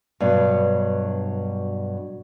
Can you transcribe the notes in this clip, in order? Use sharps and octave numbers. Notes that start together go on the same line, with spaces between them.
G2 B2 F#3